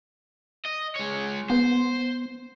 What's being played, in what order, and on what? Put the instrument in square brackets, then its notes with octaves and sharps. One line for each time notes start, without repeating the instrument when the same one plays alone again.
[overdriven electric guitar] D#5
G#3 C#5
[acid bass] B3 [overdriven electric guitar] C5